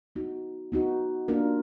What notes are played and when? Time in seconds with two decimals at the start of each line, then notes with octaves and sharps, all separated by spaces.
0.16 B3 D#4 F#4
0.72 B3 D#4 F#4
1.28 A#3 D4 F4 A#4